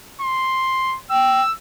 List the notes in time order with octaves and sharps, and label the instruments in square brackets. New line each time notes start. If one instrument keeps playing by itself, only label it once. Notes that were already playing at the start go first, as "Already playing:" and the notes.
[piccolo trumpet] C6
[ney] G5 [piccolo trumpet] E6